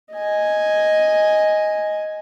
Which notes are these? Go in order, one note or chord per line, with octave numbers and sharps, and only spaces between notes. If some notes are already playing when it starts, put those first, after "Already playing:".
D#5 G#5